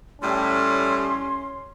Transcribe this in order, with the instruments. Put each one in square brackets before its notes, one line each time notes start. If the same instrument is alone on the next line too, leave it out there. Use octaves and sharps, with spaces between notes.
[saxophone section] A2 G3 [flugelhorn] C#4 [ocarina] C6